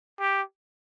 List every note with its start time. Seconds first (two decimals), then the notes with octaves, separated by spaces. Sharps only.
0.19 G4